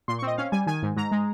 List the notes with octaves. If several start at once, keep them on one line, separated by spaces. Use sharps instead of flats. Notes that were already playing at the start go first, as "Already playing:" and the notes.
A#2 C6
C#6
C4 D#5
C#4 F5
G3 G#5
D#3 G#5
G#2
G#2 A#5
G#3